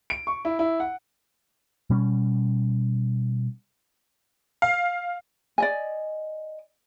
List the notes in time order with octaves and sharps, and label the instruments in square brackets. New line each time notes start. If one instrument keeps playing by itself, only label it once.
[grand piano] D7
C#6
E4
E4
F#5
[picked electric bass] B2 G3 C#4
[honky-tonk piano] F5
[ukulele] D5 D#5 G#5